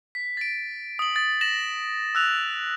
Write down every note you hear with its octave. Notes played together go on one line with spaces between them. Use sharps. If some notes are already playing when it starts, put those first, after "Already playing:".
B6
A6 D7
D#6 F#7
A6
A#6 E7 F#7
E6 F#6 F7